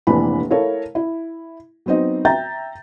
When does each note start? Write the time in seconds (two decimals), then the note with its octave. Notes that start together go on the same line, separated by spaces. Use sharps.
0.07 F1 A#1 E3 D4 B5
0.50 E4 A4 A#4 C#5 F5
0.95 E4
1.86 F#3 B3 C4 D#4 D#5
2.25 E5 G5 A#5 G6 A6